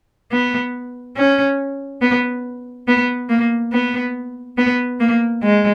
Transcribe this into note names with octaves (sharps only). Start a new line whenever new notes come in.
B3
C#4
B3
B3
A#3
B3
B3
A#3
G#3